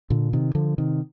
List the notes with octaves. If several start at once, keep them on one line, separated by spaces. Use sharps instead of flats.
A#2 D3
C3 D#3
D3 F3
C3 D#3